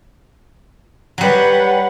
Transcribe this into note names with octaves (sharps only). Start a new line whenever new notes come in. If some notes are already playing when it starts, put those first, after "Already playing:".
F#3 G3 B4 F#5